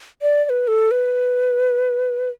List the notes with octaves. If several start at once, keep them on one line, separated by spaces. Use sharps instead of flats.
D5
D5
B4
A4
B4